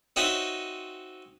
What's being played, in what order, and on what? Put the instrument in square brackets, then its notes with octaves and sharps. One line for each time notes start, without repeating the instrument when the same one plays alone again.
[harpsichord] C4 D#4 F#4 C#5 D#5 E5